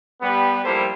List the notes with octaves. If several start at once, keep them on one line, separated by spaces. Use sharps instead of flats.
G3 B3
F3 G3 A#3 E4 A4 C5